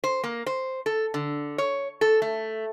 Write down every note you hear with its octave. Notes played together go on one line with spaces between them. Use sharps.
C5
A#3
C5
A4
D3
C#5
A4
A3